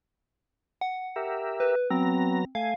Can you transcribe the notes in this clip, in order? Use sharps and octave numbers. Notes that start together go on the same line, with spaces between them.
F#5
G4 A#4 E5
B4
F#3 B3 C4 A#5
A3 F5 G#5